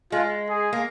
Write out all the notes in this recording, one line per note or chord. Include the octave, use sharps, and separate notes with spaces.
G#3 F4
G#4
A#3